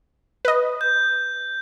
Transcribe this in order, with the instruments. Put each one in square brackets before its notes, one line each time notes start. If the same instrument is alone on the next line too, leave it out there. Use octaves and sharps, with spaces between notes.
[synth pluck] B4 D#5
[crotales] G6